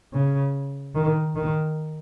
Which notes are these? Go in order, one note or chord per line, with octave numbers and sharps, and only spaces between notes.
C#3
D#3
D#3